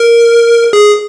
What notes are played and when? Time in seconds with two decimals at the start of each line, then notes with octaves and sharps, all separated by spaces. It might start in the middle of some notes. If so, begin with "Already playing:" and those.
Already playing: A#4
0.73 G#4